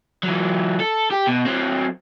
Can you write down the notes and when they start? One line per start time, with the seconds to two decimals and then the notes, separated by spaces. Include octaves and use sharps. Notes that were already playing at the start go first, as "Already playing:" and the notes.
0.23 E3 F#3
0.80 A4
1.11 G4
1.27 B2
1.45 F#3 C4